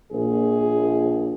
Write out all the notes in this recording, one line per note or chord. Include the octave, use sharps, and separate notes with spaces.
A#1 G#4